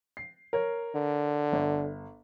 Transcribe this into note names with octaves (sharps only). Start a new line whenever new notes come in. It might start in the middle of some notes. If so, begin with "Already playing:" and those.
C7
A#4 C#5
D3
G1